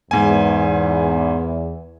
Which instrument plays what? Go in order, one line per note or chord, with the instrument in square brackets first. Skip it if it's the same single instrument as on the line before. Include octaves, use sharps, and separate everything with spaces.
[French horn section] E2 [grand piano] G#2 G#5